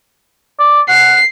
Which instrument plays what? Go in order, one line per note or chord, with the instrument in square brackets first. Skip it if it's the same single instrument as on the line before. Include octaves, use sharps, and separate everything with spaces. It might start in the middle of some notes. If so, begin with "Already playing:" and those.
[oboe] D5
[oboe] F#5 [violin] C7